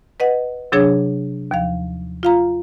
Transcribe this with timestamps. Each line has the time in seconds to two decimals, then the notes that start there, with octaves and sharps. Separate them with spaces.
0.20 B4 D#5 F#5
0.72 C3 F#3 D4 G#4 C#5
1.51 D#2 F3 F5
2.23 F4 F5 A#5